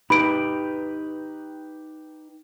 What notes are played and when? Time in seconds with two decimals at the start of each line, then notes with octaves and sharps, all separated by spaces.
0.10 D#4 G4 B4 B5 D7